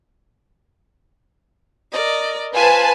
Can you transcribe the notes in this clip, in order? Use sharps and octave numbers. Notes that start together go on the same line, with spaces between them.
A#4 D5 D#5
F4 B4 C5 G#5 A5